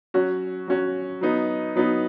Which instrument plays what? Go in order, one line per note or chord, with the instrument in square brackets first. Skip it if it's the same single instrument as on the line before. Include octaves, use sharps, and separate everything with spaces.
[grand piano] F#3 C#4 F#4
F#3 C#4 F#4
F#3 B3 D#4
F#3 B3 D#4